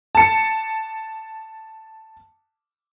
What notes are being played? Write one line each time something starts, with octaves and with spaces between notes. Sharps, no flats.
A5 C#7